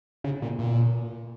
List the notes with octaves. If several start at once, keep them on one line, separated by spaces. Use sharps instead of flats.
C#3
A#2
A#2